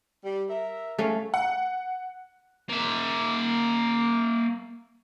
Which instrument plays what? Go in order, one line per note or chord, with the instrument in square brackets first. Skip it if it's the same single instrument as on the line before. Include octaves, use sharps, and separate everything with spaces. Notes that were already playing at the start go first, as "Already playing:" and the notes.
[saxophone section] G3
A#4 E5
[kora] A3 C#4 F5
[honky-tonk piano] F#5
[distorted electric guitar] A#3 E5